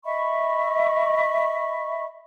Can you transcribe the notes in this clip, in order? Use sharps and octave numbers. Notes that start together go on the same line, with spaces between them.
D#5 E5 B5 C#6